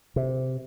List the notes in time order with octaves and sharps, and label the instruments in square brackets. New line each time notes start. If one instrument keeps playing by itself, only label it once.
[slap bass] C3